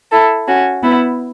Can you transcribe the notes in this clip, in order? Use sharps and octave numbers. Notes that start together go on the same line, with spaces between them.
E4 A4
C#4 F#4
B3 E4